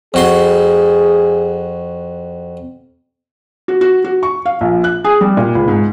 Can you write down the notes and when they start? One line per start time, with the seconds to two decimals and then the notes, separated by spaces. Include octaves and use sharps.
0.14 F2 F#4 G#4 C6
3.68 F#4
3.81 F#4
4.04 F#4
4.23 C#6
4.46 F5
4.61 A#1
4.84 F#6
5.04 G#4
5.21 G3
5.37 A#2
5.55 C#2
5.68 G#2